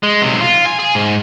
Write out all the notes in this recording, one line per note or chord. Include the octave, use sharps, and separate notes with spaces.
G#3
B1 C3
F4
G#5
G#4
G#2